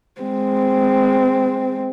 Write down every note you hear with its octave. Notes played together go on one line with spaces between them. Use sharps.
G#3 C4